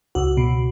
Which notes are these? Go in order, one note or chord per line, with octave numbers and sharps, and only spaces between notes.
C#2 F#4
B2